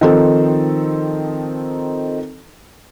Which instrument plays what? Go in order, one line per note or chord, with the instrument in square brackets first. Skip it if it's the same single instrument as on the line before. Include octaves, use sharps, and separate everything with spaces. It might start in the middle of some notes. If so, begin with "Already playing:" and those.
[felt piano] D#3 F3 C4 D#4 A4